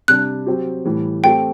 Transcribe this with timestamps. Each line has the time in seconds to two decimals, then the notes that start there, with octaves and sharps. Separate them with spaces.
0.08 C3 G3 D4 F#6
0.46 F#3 C4 G4
0.85 A2 E3 G3
1.24 A3 C4 G4 G5